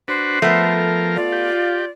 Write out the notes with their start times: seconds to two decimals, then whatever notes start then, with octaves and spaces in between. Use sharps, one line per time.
0.08 D4 F#4 B4 C5
0.42 F3 A3 B3 A#4
1.16 F4 D5
1.32 G4